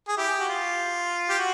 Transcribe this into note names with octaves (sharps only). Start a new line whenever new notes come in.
G#4
E4 G4
F#4
F4
G4
F#4